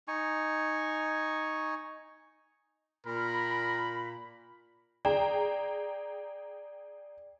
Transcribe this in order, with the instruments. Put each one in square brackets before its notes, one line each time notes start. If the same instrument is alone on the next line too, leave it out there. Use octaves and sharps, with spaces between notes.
[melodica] D#4 G#5 C#6
[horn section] A#2 B5 [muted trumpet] A#4
[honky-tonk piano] G#4 G5 A#5 [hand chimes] D5